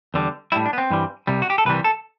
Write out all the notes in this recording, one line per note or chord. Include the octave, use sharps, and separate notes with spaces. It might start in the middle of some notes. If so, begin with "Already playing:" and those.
E2 D3 G3
A2 G3 E4
D4
B3
C4
G2 E3 G3
C2 C3 G3
F#4
G4
A4
C2 C3 E3 G3 B4
A4